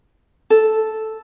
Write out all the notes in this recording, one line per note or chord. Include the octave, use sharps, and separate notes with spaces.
A4